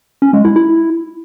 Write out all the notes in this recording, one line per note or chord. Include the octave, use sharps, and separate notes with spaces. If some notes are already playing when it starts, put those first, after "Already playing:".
C#4
G#3
E4
E4